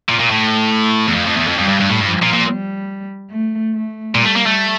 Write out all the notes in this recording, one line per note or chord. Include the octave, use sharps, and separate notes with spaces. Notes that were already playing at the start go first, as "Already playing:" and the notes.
A#2
A#2
A2 A3
E2
F2
F2
E2
F2
F2 G3
G2
G2
A2
G2 F3
A#2
A#2
G3
A3
A3
A#2 G3
A3
A#3
A3